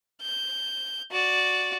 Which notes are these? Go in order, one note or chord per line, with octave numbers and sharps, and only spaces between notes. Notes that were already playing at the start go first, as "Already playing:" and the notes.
G6
F#4 D5